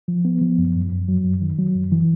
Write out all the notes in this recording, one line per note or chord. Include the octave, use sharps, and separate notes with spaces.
F3
B3
F3
F#2
F#2
F#2
F#3
F#2
D#3
F#3
F#2
E3